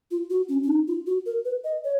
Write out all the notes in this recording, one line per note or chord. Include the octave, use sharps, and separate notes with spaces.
F4
F#4
C#4
C#4
D#4
F4
F#4
A#4
B4
D#5
C#5